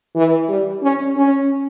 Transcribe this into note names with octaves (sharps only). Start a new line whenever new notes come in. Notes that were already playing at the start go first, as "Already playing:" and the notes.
E3
G3
C#4
C#4